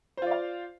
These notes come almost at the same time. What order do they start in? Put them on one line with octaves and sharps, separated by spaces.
C5 F4 D5 F5